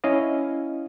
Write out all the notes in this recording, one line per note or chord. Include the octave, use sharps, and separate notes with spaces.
C#4 E4 D#5 F5